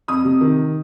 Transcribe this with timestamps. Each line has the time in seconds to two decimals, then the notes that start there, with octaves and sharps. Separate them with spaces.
0.08 F2 D#6
0.25 C3
0.41 D#3